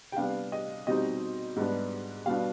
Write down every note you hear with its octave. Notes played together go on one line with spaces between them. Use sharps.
G5
C3 G3 B3 D4 F5
D#5
B2 G3 C4 D#4 D#5
G#2 G3 B3 D4
B2 G3 B3 D4 F5